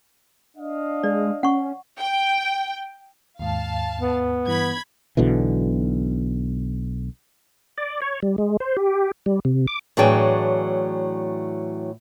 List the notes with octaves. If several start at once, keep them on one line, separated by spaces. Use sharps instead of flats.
D4 D#5 F5
G#3 D5
C#4 F#5 C#6
G5
D#2 G#2 F5 A5
B3
G2 E3 B5 G#6
B1 B2 D3 E3
D5
C#5
G3
G#3
C5
G4
G3
C3
D6
A2 E3 F#3 D4 G#4 G5